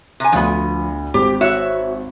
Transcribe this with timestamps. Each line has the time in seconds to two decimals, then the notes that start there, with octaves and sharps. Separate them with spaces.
0.20 C3 G#5
0.32 D2 D3 F3 B3
1.14 G#1 G4
1.41 F#4 C#5 E5